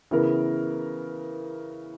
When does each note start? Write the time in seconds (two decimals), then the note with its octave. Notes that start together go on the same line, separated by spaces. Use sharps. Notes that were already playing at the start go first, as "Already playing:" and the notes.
0.11 C#3 E3 B3 E4 A#4